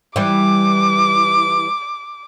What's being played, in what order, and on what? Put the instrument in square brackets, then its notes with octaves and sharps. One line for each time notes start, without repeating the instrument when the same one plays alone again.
[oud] E3 G3 [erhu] D6